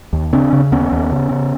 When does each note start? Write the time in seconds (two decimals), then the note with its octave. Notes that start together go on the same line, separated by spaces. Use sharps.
0.13 D#2
0.33 C#3 C4 D4
0.53 C#3
0.72 D#2 B3 C#4
0.92 D#2
1.12 C#3
1.31 C#3